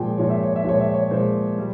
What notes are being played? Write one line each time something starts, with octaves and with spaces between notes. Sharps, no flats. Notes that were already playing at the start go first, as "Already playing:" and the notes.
Already playing: A#2 F3 G#3 G5 G#5
A#2 F3 G#3 C#5
E5
C#5
E5
A#2 F3 G#3 C#5
E5
C#5
A#2 F3 G#3 C5
G3